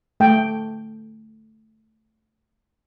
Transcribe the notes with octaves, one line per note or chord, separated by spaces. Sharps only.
A3 G5